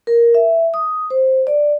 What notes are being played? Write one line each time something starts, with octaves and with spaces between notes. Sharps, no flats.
A#4
E5
D#6
C5
D5